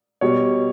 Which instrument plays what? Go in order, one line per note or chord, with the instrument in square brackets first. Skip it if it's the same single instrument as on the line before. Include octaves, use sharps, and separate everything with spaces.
[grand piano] B2 G3 C#5